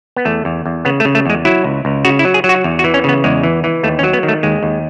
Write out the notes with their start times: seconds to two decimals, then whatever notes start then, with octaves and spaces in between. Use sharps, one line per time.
0.16 B3
0.25 E2 A3
0.45 E2
0.66 E2
0.85 C#3 B3
1.00 A3
1.05 C#3
1.15 A3
1.26 E2 G#3
1.45 F#3 E4
1.64 C#2
1.85 C#2
2.05 C#3 F#4
2.19 E4
2.25 F#3
2.34 G#4
2.44 F#3
2.49 F#4
2.64 E2
2.79 F#4
2.84 E3
2.94 C#4
3.04 C#3 B3
3.24 E2 G#3
3.43 E3
3.64 E3
3.83 D#2 A3
3.99 C#4
4.03 F#3
4.13 B3
4.23 D#3
4.28 A3
4.43 D#2 G#3
4.63 D#2